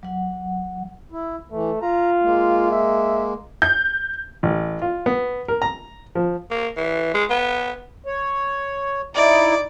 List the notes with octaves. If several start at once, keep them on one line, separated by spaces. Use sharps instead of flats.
F#3 F#5
E4
E3 A3
F4 A#5
G#3 A#3
E5
G6
A1
F4
B3
A#4
A#5
F3
A#3
E3
G#3
B3
C#5
D#4 E4 D5